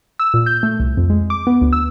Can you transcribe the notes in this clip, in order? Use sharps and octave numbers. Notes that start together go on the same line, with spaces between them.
E6
A#2
G6
A3
C2
F2
G#3
D6
B3
D2
E6